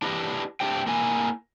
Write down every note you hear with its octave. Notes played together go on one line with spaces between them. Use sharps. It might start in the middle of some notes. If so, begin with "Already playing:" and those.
D4 E4 G4 B4 D#5
A3 D4 G4 C5 G5
A#3 E4 G#5